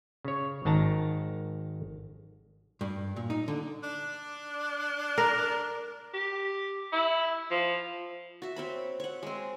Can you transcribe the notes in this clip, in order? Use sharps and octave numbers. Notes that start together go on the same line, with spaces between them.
C#3 C#5
G#1 D#3 A5 A#5
G2
A#2
D#4
D3
D4
A#4
G4
E4
F3
F#4 E5
C4 C#5 B5
C#5 F#5
G#3 C4